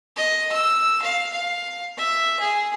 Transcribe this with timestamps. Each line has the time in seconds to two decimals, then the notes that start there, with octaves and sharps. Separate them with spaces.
0.16 D#5
0.52 E6
1.02 F5
1.32 F5
1.97 E5
2.40 G#4